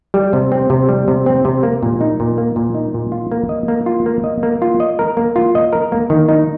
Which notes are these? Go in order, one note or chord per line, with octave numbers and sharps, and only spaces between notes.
G3
C3
C4
C3
G3
C3
C4
C3
A#3
A#2
D#4
A#2
A#3
A#2
D#4
A#2
F4
A#3
D#5
A#3
F4
A#3
D#5
A#3
F4
D#5
A#4
A#3
F4
D#5
A#4
A#3
D#3
D#4